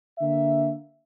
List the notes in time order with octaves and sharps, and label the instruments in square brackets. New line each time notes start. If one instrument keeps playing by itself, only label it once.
[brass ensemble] D3 A#3 E5